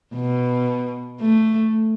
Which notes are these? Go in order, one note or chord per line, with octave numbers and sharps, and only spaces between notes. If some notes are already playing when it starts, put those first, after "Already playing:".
B2
A3